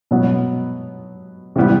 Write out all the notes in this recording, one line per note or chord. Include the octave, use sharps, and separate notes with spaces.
B2 F#3 B3
C3 E3 G3 B3